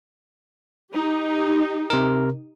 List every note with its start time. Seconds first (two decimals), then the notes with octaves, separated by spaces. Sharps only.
0.93 D#4 G4
1.90 C3 A#4